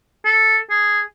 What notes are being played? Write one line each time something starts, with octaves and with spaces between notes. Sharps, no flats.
A4
G#4